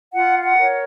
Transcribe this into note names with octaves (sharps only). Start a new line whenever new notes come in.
F4 F#5
F#5
A#4 C#5